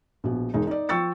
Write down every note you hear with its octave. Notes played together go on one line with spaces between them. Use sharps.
A#1 B2
E1 G#3 D#4
D#4 D5
F3 G5 C#6 E6 A6 C#7